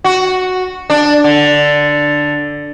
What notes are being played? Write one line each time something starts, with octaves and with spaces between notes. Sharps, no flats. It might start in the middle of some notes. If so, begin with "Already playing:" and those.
F#4
D4
D3